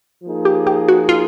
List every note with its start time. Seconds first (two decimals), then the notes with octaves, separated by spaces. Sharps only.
0.24 F3 A#3 D#4 G#4
0.45 G4
0.67 G4
0.88 F#4
1.09 F4